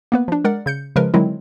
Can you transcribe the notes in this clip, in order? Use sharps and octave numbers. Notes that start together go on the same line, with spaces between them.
A#3 B3 B4
F3 D4
G#3 A#4 D5 F#5
C#3 G6 C#7
C#3 F3 G#3 A#4 B4
D3 D#3 F#3 G#3 C4 E4